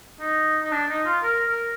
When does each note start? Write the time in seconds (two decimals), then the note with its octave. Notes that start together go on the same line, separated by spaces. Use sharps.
0.20 D#4
0.63 D#4
0.72 D4
0.89 D#4
1.06 F4
1.23 A#4
1.49 A#4